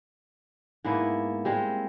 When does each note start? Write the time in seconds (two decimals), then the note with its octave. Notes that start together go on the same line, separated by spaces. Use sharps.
0.84 G#2 A#3 B3 E4
1.45 G3 G#3 C4